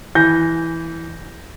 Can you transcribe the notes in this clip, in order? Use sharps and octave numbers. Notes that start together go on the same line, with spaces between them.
E3 G#5 G6 A#6